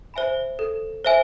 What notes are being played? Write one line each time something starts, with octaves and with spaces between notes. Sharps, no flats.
C5 E5 G#5 B5
A4
C5 E5 G#5